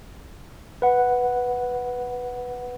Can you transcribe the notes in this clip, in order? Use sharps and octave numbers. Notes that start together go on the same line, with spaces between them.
B4 F#5